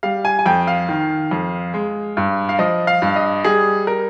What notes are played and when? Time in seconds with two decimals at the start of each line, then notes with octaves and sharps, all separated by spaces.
0.03 G3 F5
0.25 G#5
0.39 G#5
0.46 F2 G5
0.67 F5
0.89 D#3
1.31 F2
1.74 G#3
2.17 G2
2.49 F5
2.59 F3 D#5
2.87 F5
3.02 G2
3.16 D#5
3.44 G3 G#4
3.87 A#4